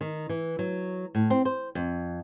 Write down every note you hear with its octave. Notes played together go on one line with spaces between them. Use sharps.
D#3
E3
F#3
A2
C4
C5
F2